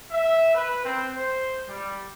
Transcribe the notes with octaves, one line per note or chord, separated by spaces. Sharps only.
E5
B4
C4
C5
G3